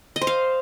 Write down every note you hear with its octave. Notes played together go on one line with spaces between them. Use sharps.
D#5
C5
F5